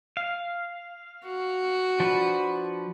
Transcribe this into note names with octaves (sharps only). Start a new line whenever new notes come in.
F5
F#4
F3 D4 B4